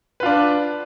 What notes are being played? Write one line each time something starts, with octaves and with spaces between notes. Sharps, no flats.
D4 F4 B4